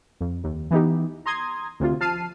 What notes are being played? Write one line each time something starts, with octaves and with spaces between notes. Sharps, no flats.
F2
D#2
E3 B3 D#4 G4
A#5 C6 D#6 G#6
D2 C3 F4
F3 A5 F6 C7 D#7